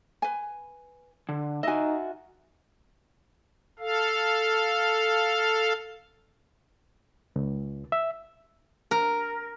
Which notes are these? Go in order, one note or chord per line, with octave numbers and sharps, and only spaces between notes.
B4 G#5
D3
D#4 F#4 D#5 E5 G#5
A4 F5
C#2
E5
A#4